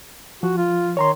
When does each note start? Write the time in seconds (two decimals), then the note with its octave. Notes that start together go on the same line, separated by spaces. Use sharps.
0.43 F3 F#4
0.58 F4
0.97 D#3 C#5 A#5 C6